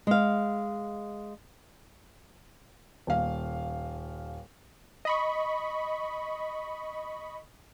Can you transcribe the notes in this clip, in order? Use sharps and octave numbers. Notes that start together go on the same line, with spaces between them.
G#3 F5
D#1 F5
D#5 B5 C#6